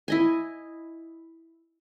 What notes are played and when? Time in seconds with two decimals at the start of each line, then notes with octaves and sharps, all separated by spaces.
0.08 E4 D#5 G#5